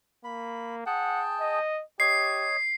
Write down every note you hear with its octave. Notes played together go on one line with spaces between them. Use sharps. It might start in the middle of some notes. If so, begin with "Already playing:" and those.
A#3 B5
G#4 F#5 G5 A5
D#5
G4 C#5 D#5 C7